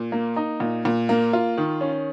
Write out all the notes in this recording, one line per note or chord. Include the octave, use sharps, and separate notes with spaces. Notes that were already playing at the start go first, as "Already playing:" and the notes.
Already playing: A#2
A#3
D#4
A#2
A#2
A#3
F4
D#3
C#4